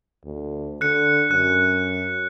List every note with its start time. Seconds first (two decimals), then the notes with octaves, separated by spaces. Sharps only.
0.25 D2
0.81 D3 F#6 C#7
1.31 F#2 F#6